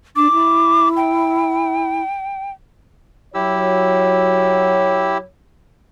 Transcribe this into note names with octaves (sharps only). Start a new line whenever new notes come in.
D4 D6
E4
G5
F#3 E4 G4 C#5 E6